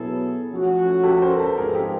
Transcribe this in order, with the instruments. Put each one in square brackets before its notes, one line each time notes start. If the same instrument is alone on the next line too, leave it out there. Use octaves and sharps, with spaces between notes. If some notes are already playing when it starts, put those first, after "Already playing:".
Already playing: [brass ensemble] B2 F#3 B3 E4 A4 [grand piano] G#4
[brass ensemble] F3 A3 C#4 F#4
[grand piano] G4 A4
A#4 C5
A4 B4
[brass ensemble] G#2 F3 G#3 C4 D#4 [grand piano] G#4 A#4
[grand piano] G4 A4